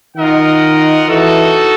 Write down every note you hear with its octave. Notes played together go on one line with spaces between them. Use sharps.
D#3 F4 A#4 D#5 F#5
E3 D#4 F#4 A4